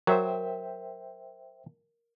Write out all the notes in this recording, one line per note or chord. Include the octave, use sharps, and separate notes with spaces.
F#3 A#4 C5 E5 G5